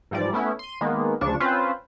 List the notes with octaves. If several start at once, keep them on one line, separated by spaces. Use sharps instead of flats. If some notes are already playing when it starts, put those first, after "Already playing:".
G#2 E3 F3 G3 D5
A3 B3 C#4 E4
C6 D#7
D#3 G#3 A#3 B3
D2 C#3 F3 D4 C#6 E7
C4 C#4 F4 B4 C5